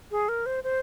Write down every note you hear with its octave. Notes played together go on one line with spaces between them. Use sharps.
G#4
A#4
C5
C5